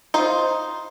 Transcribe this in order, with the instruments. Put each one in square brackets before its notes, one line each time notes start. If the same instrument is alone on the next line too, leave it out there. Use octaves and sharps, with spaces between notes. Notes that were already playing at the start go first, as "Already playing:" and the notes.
[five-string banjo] D#4 F4 C5